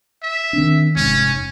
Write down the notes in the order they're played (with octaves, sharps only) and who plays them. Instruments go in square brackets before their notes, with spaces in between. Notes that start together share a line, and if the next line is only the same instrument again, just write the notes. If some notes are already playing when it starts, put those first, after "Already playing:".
[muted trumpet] E5
[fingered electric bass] D#3 C4 D4
[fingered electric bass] F1 G#2 [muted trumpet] C#4